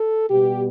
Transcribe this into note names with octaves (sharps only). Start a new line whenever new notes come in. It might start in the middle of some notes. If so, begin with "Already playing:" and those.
Already playing: A4
B2 G3 B3 G4